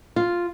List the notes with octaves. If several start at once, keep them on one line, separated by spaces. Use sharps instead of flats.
F4